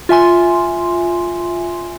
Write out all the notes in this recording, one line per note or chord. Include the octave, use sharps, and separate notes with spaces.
F4 E5 G#5 C6